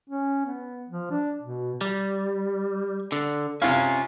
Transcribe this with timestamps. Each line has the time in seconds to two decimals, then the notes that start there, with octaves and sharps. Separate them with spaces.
0.10 C#4
0.46 B3
0.89 F3
1.11 D4
1.42 B2
1.81 G3
3.12 D3
3.62 C3 C#4 E4 F4 F5